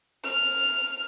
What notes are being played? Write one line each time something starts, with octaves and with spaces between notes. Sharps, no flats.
F6